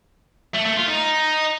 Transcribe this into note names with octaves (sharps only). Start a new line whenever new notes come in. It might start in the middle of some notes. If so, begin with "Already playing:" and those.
A3
A3
F4
D#4